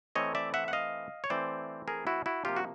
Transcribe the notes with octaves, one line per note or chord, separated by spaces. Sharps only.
E3 A3 C4 C#5 D#5
D5 E5
E5 F#5
F#5
D#5 F5
C#5
E3 A3 C4 C5 D5
G#4 A#4
E4 F#4
E4 F#4
C3 F3 A#3 F4 G4
F#4